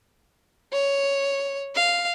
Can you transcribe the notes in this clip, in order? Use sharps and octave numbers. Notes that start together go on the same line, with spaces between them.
C#5
F5